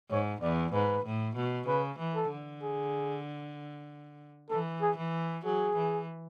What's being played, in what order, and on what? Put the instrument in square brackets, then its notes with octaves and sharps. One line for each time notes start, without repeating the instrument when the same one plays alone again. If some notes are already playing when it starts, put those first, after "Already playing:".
[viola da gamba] G#2 [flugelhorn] C#5
[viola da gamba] E2 [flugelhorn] D5
[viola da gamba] G#2 [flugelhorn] B4
[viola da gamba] A2
B2
[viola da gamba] C#3 [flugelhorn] B4
[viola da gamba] E3
[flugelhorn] A4
[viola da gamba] D3
[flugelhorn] G#4
[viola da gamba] E3 [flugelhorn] A4
[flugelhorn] G#4
[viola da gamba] E3
[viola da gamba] F#3 [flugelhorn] G#4
[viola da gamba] E3